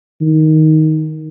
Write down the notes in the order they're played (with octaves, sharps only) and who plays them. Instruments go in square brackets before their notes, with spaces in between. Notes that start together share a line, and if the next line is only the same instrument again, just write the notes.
[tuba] D#3